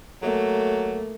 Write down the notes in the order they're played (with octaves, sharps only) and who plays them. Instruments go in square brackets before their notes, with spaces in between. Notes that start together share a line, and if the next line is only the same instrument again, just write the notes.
[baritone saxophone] F#3 [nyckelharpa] A3 A#3